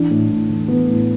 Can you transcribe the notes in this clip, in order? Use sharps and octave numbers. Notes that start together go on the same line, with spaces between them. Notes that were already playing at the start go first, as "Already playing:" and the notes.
Already playing: E3 D4
A2
A2
E3
E3 B3
A2